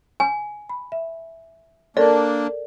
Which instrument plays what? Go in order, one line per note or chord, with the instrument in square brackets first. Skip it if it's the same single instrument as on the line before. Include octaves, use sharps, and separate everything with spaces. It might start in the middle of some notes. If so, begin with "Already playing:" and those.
[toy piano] G#5
[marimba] B5
E5
[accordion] A#3 D4 [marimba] A4 A#4 [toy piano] D5